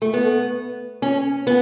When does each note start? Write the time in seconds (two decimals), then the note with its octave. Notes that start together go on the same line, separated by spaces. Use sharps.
0.02 A3
0.14 B3
1.02 C#4
1.47 B3